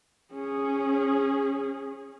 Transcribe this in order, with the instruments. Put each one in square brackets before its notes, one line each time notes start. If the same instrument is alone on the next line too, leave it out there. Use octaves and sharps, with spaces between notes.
[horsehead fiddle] C#4 G#4